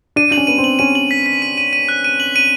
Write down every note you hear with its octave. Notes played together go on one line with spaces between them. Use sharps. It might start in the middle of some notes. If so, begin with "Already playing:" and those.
D4 D#7
D4 F#7
C#4
B3 D#7
C4
F#7
C#4 D#7
F#7
B6
B6
D#7
D#7
D#7
F#6
D#7
F#7
D#7